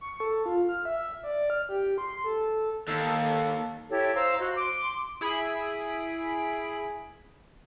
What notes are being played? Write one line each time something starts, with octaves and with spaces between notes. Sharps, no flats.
C#6
A4
F4
F6
E5
D5
F6
G4
C6
A4
D#2 A4
E4 G4 A4 C#5
C5 F5 A#5 E6
F#4 C5 D#5
C6 D6
E4 G#4 B5 D7